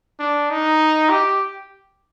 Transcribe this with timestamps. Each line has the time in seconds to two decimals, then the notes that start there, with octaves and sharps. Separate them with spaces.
0.19 D4
0.50 D#4
1.09 G4